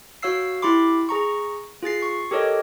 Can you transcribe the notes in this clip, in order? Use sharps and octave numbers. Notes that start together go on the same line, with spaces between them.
F#4 C#5 F5 E6 C7
E4 G4 B5 C6 D6
G#4 A#5 C#6
F4 G#4 A6 C7
C#6
G4 A4 A#4 C#5 D#5